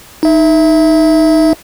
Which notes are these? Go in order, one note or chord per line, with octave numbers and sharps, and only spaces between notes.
D#4 E5